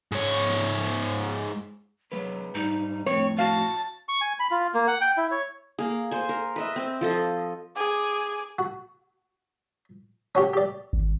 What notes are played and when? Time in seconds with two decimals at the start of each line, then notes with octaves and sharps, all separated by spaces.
0.12 G#2 C#5
2.12 F#3 G#3 B3 B4
2.54 G#2 G3 D#4
3.06 F2 A2 C4 C#5
3.38 F#4 F5 A5
4.09 C#6
4.21 G#5
4.39 B5
4.51 F4
4.74 A#3
4.88 F#5
5.01 G5
5.17 E4
5.31 C#5
5.79 A#3 G#4
6.11 C5 G#5
6.29 A#4
6.56 B4 D#5 E5
6.76 C4
7.01 F3 A4 D#5
7.76 G#4 D6
8.59 F#4
10.35 C#4 F#4 G4
10.54 G4 D5
10.93 G#1